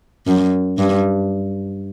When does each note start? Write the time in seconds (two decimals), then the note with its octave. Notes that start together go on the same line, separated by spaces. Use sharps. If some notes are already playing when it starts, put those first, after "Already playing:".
0.27 F#2
0.78 G2